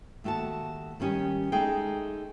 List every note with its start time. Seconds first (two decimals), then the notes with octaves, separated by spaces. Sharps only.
0.24 D#2 A3 F#4 G5 A5
1.00 D#3 G3 C#4 G4 D#5
1.52 G#3 A3 D#4 G#4 D#5 G5